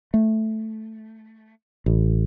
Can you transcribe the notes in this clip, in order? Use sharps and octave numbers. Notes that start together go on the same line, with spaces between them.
A3
A1